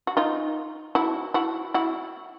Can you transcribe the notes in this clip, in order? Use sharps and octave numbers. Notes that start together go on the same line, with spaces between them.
F#4
D#4 F4
E4 F#4
E4 F#4
E4 F#4